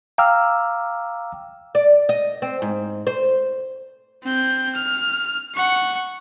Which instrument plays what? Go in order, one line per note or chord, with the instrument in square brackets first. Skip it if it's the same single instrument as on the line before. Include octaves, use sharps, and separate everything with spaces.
[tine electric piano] F5 G5 A#5 D6 E6 F6
[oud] D5
D#5
C4
G#2
C5
[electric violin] C4 G6
F6
F#5 C#6